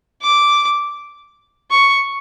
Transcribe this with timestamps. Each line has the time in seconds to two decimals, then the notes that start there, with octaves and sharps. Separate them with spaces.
0.22 D6
1.71 C#6